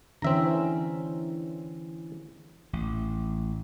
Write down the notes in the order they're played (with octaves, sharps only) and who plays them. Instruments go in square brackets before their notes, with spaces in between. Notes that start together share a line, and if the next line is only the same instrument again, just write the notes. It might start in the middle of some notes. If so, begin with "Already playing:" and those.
[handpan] D3 E3 C#4 [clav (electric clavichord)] C4 E5 A#5
[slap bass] A1